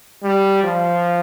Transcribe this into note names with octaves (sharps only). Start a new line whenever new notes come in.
G3
F3